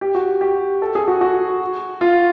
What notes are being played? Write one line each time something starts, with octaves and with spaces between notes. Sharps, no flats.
G4
F#4
G4
A4
G#4
F#4
F#4
F4